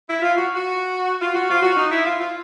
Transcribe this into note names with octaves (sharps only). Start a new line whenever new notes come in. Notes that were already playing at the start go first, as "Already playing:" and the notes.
E4
F4
F#4
F#4
F4
F#4
F4
F#4
D#4
E4
F4
F4